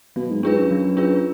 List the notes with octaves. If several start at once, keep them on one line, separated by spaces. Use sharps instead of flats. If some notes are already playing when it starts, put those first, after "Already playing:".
B2 F#3
G#2
G#2 D4 F4 G#4 B4
F#2
F#3
D4 F4 G#4 B4